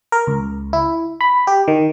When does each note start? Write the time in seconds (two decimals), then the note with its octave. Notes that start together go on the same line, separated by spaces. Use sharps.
0.12 A#4
0.27 C#2
0.73 E4
1.21 B5
1.47 G4
1.68 D#3